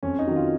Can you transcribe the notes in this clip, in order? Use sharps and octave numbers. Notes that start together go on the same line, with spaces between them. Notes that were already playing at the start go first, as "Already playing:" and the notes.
F2 C#4
D#4
D#3 F#3
F4